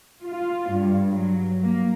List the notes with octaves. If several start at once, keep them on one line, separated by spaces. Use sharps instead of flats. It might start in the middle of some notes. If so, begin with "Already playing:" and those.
F4
G2
F#3
A#3